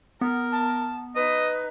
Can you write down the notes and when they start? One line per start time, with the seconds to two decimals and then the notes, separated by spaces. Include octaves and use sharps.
0.21 B3 A#4
0.52 A5
1.16 D#4 B4 D#5